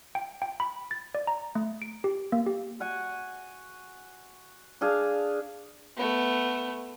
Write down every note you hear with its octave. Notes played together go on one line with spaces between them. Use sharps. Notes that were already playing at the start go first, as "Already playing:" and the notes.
G5
G5
B5
A6
D5
A#5
A3
D7
G4
A#3
G4
F#4 F#5 G#5
D4 G#4 F5 A5
A3 B3